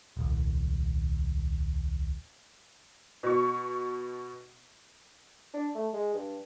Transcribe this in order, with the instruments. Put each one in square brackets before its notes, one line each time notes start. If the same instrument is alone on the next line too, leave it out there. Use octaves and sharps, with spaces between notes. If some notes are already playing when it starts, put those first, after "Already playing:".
[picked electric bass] D#1 C2
[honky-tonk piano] B2 C#6
[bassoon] D4
A3
G#3
G2